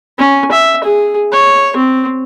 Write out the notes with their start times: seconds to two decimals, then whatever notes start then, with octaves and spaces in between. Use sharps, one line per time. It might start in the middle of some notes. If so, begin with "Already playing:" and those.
0.18 C#4
0.52 E5
0.84 G#4
1.32 C#5
1.77 C4